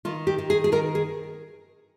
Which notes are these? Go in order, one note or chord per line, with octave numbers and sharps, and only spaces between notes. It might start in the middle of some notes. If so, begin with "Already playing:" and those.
D#3 F4
G4
D#3
G#4
G#4
D#3 A#4
G#4